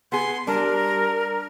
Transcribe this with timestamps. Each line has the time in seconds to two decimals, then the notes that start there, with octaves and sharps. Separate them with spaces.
0.12 B3 G#4 C6
0.47 G3 D4 A#4